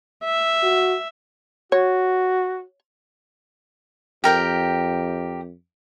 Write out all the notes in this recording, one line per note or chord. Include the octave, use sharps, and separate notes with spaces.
E5
F#4
F#4 C#5
F2 G4 A#4 G5